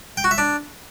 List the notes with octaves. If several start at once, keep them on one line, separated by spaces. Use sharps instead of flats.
G5
F#4
E5
D4